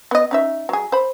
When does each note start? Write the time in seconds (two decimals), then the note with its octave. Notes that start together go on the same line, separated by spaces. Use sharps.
0.11 B3 D#5
0.31 C#4 D#4 E5
0.69 F#3 G#4
0.92 C5 B5